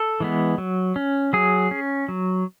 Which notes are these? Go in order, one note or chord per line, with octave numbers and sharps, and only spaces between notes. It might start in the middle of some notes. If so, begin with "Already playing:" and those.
Already playing: A4
E3 G#3 B3
F#3
C#4
F#3 G#4
C#4
F#3